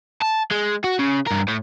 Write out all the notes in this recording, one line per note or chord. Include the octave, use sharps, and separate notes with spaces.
A5
G#3
F#4
C#3
G2 A#4
A2